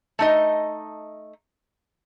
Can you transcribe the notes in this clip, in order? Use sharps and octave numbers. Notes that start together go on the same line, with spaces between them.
A3 D#4 D#5